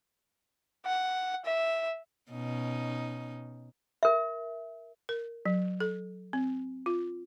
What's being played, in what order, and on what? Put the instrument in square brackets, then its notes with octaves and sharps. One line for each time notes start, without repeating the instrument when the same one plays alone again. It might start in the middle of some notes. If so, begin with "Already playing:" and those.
[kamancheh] F#5
E5
[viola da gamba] B2 C#4 D#4
[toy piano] A#4 E5
[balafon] A#4
F#3
A4
C4
F4